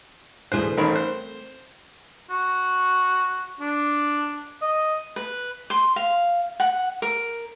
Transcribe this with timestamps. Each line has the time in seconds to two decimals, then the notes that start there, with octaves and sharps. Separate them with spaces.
0.52 D2 B2 E3 G#4 C5
0.78 A1 D#3 C4 A#4 B5
0.96 C5
2.30 F#4
3.60 D4
4.62 D#5
5.16 B4
5.70 C6
5.96 F5
6.60 F#5
7.02 A#4